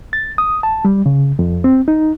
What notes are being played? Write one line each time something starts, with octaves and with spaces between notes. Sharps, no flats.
A6
D#6
A5
G3
C#3
F2
C4
D#4